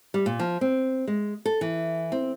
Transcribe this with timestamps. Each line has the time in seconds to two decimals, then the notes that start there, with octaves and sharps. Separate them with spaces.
0.14 G3
0.26 A#2
0.39 F3
0.61 C4
1.07 G#3
1.45 A4
1.61 E3
2.12 C4